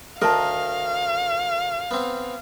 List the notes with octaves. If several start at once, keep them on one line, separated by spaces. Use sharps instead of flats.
D2 D#3 A#4 D#5 F5 A5
B3 C4